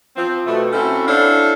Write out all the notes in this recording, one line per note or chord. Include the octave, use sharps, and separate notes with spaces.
F3 C4
B2 A3
C4 C#4 E4 F#4 A4
D4 E4 A4 C5 C#5 F5